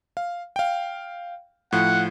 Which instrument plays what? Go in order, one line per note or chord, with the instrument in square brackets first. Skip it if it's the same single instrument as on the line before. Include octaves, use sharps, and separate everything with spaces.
[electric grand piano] F5
F5 G5
[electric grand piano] A2 F3 [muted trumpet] F#5